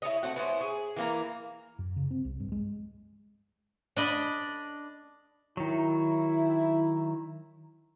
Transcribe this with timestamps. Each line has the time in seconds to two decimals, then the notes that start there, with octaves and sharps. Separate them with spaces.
0.02 E4 A4 C#5 D#5
0.23 A3 C4 F#4
0.36 B3 C#4 E4 C5
0.61 G#4
0.96 E3 A#3 A#5
1.79 F#2
1.96 C#3
2.11 C4
2.25 C2
2.40 G2
2.52 G#3
3.96 D4 D#5 B5
5.57 D#3 F#3 E4